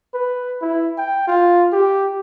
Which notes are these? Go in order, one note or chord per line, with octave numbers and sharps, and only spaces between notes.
B4
E4
G5
F4
G4